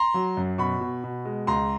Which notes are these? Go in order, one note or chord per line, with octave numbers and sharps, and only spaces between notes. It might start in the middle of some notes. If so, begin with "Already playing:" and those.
Already playing: A#5 C6
F#3
F#2
B2 B5 C#6
B2
B2
G#3
C#2 A#5 C6